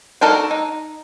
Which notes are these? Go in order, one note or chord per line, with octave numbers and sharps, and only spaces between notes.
D4 D#4 F#4 A4 A#4
D#4